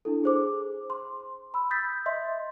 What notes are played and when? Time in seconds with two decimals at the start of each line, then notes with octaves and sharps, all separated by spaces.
0.05 D4 E4 A4
0.24 G#4 C5 D6
0.90 C6
1.54 B5 E6
1.70 D#6 G6 A6 B6
2.06 D#5 E5 C6